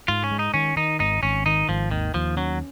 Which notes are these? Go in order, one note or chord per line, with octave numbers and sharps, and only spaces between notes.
G#2 F4
C#4
G#3
D#4
D#3 C#4
D#3 D#4
G#1 D#4
G#1 C#4
D#3 D#4
G#1 F3
D#2 D#3
D#2 F3
F#3 C#4